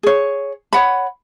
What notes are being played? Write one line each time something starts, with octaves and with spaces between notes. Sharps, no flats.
G#4 C#5
C#5 F#5 B5